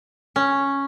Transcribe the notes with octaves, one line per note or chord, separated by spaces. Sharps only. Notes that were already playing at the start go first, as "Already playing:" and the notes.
C#4